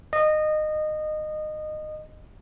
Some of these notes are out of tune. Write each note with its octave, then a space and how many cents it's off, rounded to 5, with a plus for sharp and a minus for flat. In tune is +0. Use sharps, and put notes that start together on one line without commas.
D#5 -20